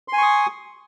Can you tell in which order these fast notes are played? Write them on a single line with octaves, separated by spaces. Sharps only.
C6 G#5 C#6 D#6